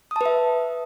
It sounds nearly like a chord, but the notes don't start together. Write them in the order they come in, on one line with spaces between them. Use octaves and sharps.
D#6 A5 B4 E5